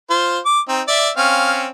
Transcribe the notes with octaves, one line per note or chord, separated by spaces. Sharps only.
F4 C5
D6
C4 D#4
D5 E5
C4 C#4 F5